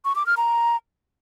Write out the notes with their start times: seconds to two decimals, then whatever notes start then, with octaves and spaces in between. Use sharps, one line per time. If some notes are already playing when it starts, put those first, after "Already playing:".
0.05 C#6
0.16 D6
0.26 F6
0.37 A#5